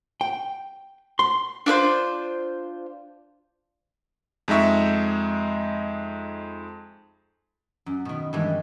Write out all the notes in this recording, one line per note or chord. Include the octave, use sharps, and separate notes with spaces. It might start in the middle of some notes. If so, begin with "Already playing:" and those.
G5
C6
D4 F4 B4 C5
F2 G#3 D#4 E5 C#6
F#2
B2 D#3
G2 D#3 E3 G3 G#3